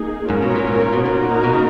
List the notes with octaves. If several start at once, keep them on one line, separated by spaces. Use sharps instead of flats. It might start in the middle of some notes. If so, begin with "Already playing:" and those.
Already playing: A#3 D#4 G#4
G#2 C#4 F4 A#4 C#5
B2
A#2
G#2
A#2
B2
A#2 A#3 D#4 F#4 A#4
B2
C#3